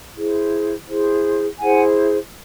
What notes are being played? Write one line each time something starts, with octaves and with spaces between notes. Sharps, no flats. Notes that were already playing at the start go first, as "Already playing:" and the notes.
E4 G#4 C5
E4 G#4 C5
E4 G#4 C5 F#5 G#5